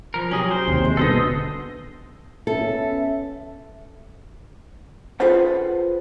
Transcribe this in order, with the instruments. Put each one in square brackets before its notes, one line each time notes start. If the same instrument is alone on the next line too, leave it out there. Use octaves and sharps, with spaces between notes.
[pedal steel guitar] F3 A#4
[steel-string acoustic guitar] F#3 G4 [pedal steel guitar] C#4 G#4 A#4
[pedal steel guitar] C5
[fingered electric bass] D#2 C3 [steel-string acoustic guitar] C4
[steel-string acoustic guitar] G#3
[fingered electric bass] D#1 B2 D3 [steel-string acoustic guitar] B3 [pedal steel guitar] A4 C5 D#5
[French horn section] B3 C#4 [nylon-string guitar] A4 [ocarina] E5
[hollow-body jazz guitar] F4 G#4 A4 B4 C5 F#5